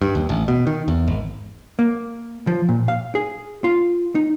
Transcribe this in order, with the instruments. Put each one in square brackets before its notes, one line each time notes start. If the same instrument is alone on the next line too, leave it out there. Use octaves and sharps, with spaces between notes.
[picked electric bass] G2
D#2
A1
B2
D#3
E2
G#1
[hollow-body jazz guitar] A#3
F3
A#2
F5
G#4
F4
D#4